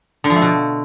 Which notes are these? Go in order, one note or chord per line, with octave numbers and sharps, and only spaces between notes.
D3
F3
A3
B2